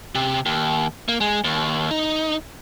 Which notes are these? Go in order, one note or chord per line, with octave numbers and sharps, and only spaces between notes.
C3
D#2
A#3
G#3
D#2
D#4